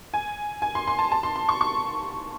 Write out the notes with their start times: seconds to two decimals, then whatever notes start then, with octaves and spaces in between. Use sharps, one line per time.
0.14 G#5
0.62 G#5
0.75 C6
0.87 C6
0.99 A5
1.12 A5
1.23 C6
1.36 C6
1.49 C#6
1.61 C#6